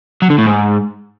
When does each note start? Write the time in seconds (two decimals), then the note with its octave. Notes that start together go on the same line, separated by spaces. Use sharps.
0.22 F#3
0.30 D3
0.38 A2
0.46 G#2